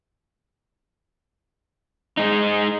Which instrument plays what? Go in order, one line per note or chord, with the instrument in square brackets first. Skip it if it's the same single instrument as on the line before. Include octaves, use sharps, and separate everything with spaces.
[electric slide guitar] G#3 D#4